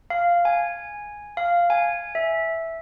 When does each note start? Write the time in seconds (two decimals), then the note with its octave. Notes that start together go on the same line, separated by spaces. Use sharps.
0.10 F5
0.45 G#5
1.37 F5
1.70 G#5
2.15 E5